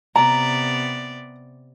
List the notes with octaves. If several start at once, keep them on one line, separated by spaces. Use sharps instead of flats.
C3 B3 D5 A#5